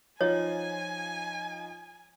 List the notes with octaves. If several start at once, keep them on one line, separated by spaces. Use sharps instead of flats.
F3 D#4 F4 C#5 G#5